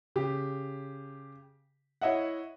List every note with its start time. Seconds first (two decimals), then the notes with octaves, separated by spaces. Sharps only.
0.16 C#3 G4
2.01 E4 C#5 D#5 E5 F#5